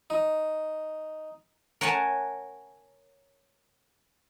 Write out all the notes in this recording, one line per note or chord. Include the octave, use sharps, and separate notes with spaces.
D#4
A#4 C#5 F#5 G#5 A5